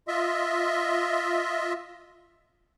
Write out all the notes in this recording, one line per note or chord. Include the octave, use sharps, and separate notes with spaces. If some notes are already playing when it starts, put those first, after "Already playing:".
F4 D#5 E5